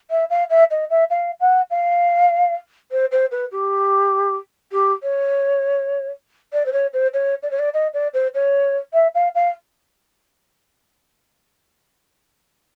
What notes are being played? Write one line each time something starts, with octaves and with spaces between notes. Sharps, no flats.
E5
F5
E5
D#5
E5
F5
F#5
F5
C5
C5
B4
G4
G4
C#5
D5
C5
C#5
C5
C#5
D5
C#5
D5
D#5
D5
C5
C#5
E5
F5
F5